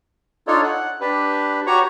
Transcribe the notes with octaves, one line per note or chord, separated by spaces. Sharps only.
D4 D#4 F4 A4 C#5
F#5
D4 G4 B4
F#4 G4 C#5 A#5 C#6